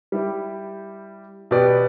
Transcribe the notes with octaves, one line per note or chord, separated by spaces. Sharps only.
G3 E4 G4
B2 B3 G4 D5